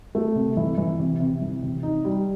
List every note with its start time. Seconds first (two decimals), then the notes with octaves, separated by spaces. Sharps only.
0.15 A3
0.35 C3
0.57 E3
0.78 E3
0.99 C3
1.20 C3
1.42 E3
1.62 C3
1.83 D#4
2.05 G3